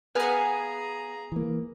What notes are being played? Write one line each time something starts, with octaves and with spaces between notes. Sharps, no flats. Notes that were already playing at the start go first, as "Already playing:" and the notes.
B3 G#4 B4 F5 F#5 G#5 A#5
E3 A#3